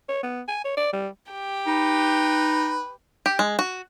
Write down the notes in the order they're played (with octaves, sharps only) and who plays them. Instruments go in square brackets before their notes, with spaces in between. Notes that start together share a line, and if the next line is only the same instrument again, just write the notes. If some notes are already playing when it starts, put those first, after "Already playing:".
[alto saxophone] C#5
B3
G#5
C#5
D5
G3
[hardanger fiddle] G4 G5
[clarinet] D#4 [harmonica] B4
[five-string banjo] G4
G#3
F#4